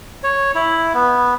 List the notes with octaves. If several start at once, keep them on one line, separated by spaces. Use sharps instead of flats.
C#5
E4
B3